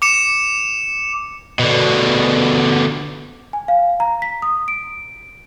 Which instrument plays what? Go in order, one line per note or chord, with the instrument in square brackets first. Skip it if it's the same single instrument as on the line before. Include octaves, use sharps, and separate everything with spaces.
[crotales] D6 C#7 E7
[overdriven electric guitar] B2 D3
[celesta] G#5
F5
A#5
B6
D#6
D7